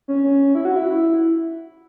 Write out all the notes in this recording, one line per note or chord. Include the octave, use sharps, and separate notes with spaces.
C#4
C#4
E4
F#4
E4